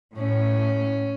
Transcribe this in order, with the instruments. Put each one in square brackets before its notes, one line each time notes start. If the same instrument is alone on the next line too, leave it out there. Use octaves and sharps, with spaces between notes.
[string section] A2 [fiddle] C#4